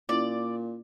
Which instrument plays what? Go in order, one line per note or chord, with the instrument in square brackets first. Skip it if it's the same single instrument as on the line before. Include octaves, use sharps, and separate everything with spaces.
[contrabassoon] A#2 [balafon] C#4 E4 F4 [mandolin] D5